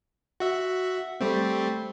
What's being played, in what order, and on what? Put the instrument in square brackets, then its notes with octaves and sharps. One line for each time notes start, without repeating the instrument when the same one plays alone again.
[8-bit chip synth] F#4 E5
G3 A3 C4